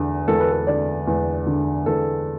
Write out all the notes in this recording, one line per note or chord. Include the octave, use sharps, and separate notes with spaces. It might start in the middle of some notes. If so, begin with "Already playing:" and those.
Already playing: E2 D3
E2 A4
B4
A4
D3 D5
E2
D3
E2 A4